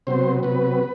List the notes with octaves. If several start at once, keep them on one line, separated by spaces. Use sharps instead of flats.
C3 F#3 B3 C5
C3 F#3 B3 B4